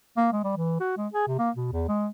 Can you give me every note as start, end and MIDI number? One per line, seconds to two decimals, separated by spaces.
0.17 0.30 58
0.32 0.42 56
0.44 0.53 55
0.57 0.76 52
0.80 0.93 66
0.97 1.07 56
1.14 1.24 68
1.27 1.37 48
1.39 1.50 58
1.56 1.69 47
1.72 1.84 40
1.88 2.08 56